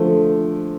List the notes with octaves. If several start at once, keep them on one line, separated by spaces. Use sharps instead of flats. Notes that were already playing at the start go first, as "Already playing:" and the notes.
Already playing: D3 F3 A3